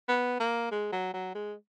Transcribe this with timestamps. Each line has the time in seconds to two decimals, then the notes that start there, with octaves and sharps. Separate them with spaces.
0.08 B3
0.40 A#3
0.71 G#3
0.92 F#3
1.14 F#3
1.35 G#3